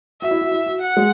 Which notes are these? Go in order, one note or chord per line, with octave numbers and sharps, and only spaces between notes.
F#4 E5
E4
F#4
E4
F#4
F#5
G#3